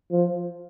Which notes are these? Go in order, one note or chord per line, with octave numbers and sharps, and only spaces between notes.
F3